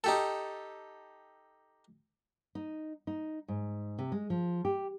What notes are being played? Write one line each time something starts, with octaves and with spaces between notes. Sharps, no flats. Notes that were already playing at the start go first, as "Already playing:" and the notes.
D#4 G4 A4
D#4
D#4
G#2
C3
G#3
F3
G4